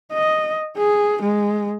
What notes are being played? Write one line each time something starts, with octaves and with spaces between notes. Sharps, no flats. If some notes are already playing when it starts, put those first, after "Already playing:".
D#5
G#4
G#3